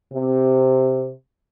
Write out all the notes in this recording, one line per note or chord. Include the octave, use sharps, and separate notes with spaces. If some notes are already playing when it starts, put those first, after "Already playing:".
C3